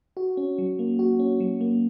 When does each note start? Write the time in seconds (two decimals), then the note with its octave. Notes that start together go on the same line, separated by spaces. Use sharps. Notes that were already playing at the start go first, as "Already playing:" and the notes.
0.17 F#4
0.37 C#4
0.58 F#3
0.79 A#3
0.99 F#4
1.19 C#4
1.40 F#3
1.61 A#3